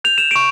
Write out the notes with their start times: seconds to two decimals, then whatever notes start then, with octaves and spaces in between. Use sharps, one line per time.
0.04 G6 F7
0.18 E7
0.31 C#6 D7